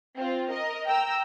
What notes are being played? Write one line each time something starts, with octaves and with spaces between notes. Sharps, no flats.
C4 F4
A#4 D#5
G5 A#5 E6